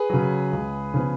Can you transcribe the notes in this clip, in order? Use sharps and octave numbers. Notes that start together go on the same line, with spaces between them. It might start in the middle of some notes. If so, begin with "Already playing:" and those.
Already playing: G#4 B4
C#3 F#3
C#2
C#3 F3 B3